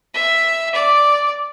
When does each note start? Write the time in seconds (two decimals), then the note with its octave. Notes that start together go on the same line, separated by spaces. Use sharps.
0.14 E5
0.75 D5